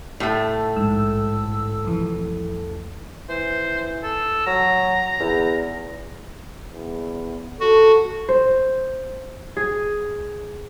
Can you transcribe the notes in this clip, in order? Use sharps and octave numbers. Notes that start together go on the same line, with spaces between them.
A2 A3
A#1 G#2 E6
C2 F2 E3
E3 C5
A4
F#3 A#5
E2
E2
F#4 A4
C5
G#4